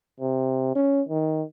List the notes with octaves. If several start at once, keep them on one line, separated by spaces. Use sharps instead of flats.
C3
C#4
D#3